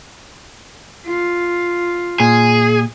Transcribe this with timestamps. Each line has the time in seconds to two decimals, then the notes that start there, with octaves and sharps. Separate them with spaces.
1.07 F4
2.20 A#2 G#4